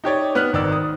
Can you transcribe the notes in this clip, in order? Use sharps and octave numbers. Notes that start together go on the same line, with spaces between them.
D#4 G4 C#5 D5
B3 F6 F#6
G#1 D#3 D5 E6
D#6